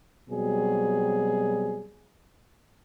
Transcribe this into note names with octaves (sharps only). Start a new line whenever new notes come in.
B2 F#3 G3 C4 G#4